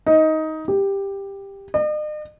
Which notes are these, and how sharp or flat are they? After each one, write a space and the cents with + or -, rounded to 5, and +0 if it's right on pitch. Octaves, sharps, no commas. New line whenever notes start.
D#4 +15
G4 +10
D#5 -45